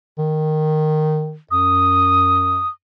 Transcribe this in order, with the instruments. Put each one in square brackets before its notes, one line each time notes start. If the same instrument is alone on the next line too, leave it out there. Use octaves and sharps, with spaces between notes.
[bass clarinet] D#3
[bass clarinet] F#2 [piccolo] D#6